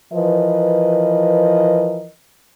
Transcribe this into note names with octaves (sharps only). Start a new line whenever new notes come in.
E3 F3 A#4 B4 D#5